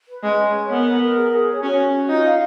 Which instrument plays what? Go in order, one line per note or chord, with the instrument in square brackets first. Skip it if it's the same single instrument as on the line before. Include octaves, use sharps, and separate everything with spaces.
[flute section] B4
[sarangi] G#3 [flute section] C#4
[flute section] C#4
C#5
[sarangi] B3 [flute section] A#4
[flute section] A#4
A#4
G#4
G#4
C#5
[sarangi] C#4 [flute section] F#4
[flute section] C#4
F#4
[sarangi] D#4 [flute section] F4
[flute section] F5